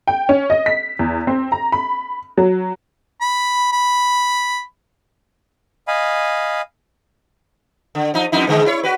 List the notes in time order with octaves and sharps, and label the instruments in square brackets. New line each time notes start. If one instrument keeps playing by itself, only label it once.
[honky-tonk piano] G5
C#4
D#5
B6
E2
C4
A#5
B5
F#3
[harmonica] B5
B5
[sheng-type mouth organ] D#5 F5 G#5 B5
[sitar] D3
F3 D#4
F2 D#4 E4
G#2 D3 G#3
E4 C#5
F#4 B4